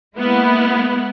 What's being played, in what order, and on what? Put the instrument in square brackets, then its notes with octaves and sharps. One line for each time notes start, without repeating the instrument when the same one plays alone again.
[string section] G#3 A#3 B3 E4